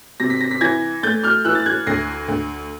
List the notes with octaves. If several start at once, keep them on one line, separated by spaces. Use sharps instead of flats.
C3 A#6
B6
A#6
B6
E3 G#6 A#6
A3 G6 A6
F6 G6
E3 E6 F#6
A6
F#6 G#6
D2 A#6 C7
D2